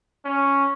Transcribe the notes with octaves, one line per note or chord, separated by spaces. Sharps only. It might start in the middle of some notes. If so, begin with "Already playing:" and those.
C#4